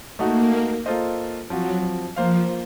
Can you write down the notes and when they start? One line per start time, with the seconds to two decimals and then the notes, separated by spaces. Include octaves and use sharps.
0.19 A3 A#3 D#4 F#4
0.86 A#3 F4 A4 C5 D#5
1.50 F3 F#3 C4 F#4
2.16 F3 A#3 F4 C5 F5